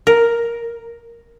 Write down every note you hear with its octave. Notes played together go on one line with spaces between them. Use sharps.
A#4